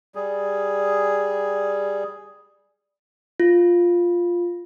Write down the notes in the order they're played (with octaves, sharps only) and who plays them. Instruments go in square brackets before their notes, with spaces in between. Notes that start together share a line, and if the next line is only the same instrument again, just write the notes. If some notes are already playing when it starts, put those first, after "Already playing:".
[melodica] G3 G#4
[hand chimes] F4